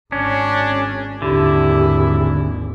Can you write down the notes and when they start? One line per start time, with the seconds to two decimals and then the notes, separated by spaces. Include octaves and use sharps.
0.12 G#1 C#4 D4
1.22 G#1 D#2 D3 E4 G4